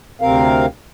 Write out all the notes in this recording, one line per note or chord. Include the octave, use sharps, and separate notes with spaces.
D2 C3 C4 A#4 F5